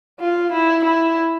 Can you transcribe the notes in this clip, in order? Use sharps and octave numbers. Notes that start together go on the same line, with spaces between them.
F4
E4
E4